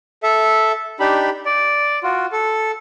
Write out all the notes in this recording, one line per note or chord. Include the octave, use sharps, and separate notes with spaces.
A4 E5
D4 D#4 G4 B5
D5
F4 F#4
A4